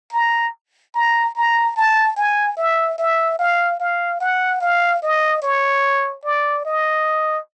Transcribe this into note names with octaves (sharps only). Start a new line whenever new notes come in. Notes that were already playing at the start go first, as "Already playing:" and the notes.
A#5
A#5
A#5
A5
G#5
E5
E5
F5
F5
F#5
F5
D#5
C#5
D5
D#5